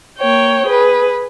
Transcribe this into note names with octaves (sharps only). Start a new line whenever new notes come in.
A#3 C#5 G5
G#4 B4